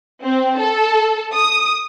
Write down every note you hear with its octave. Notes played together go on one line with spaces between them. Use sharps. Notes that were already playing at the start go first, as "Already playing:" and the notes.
C4
A4
D#6